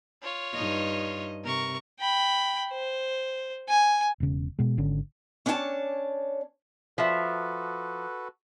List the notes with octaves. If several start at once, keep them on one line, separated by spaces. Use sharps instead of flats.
F4 C#5
G2 D#4 D#5
C3 A#4 C#6
G5 B5
C5
G#5
E1 C#3
B2 G#3
G#1 D3 C#4
C#4 D4 C#5 G5 A5
F3 F#4 A4 B4 E5